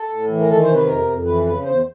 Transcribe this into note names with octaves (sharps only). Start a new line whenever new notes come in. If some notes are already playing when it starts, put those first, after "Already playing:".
Already playing: A4
A2
E3
A#4
D#3 A4
C5
C3
B4
F2 A#4
F2
E3 B4
C#3 B4
E2 C5